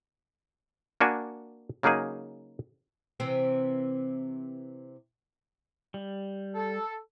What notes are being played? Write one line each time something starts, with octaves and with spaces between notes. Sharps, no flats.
A#3 D4 F#4 G#5
C#3 F#3 A#3 D#4 G#4
C3 E3 C4
G3
A4